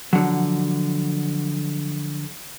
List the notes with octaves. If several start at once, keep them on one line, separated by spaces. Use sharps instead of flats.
D3 F3 F#3